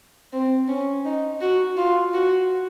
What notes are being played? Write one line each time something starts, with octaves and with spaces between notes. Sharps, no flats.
C4
C#4
D#4
F#4
F4
F#4